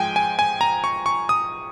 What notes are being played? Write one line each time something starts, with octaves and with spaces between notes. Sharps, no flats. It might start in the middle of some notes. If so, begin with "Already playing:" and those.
Already playing: G#2 F3 G#3 G5 G#5
G#5
G#5
A#5
C#6
C#6
D#6